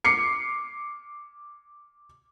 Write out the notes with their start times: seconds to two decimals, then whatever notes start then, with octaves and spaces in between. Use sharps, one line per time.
0.05 D6 C7 C#7